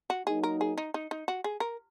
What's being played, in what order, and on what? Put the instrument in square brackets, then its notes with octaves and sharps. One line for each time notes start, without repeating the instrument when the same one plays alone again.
[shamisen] F#4
[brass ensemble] F#3 A#3 D#4 [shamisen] G#4
[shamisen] A#4
G#4
D#4
D#4
D#4
F#4
G#4
A#4